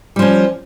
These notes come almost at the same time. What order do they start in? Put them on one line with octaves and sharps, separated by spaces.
G3 F3 C#4